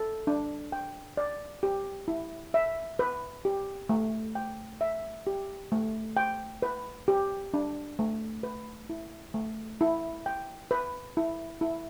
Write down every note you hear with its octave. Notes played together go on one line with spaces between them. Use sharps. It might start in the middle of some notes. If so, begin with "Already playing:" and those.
Already playing: A4
D4
G5
D5
G4
E4
E5
B4
G4
A3
G5
E5
G4
A3
G5
B4
G4
D4
A3
B4
E4
A3
E4
G5
B4
E4
E4